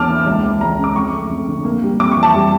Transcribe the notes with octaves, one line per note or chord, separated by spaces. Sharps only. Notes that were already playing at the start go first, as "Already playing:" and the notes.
Already playing: E2 D3 A#3 D4 A5 D6 F6
E3
C#2
E3
C#2 A#5
C#3
D6
F2 C#6
A3
F2
D3
A#3
G3
F2 D6
C#6
E3
A5
G3